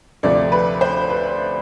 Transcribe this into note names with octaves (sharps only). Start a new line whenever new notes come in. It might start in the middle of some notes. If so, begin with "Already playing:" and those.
D2 C3 F3 A3 D5
B4
C5
B4